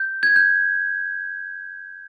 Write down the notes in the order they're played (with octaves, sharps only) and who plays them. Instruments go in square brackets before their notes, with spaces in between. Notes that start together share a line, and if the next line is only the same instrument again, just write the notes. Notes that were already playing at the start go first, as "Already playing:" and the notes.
Already playing: [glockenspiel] G6
G#6
G6